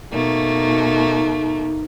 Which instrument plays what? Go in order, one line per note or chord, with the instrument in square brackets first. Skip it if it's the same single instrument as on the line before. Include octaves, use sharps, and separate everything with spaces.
[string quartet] B2 A3 A#3 [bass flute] D#4